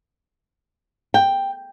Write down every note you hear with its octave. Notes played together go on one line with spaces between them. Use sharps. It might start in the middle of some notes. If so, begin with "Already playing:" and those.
G5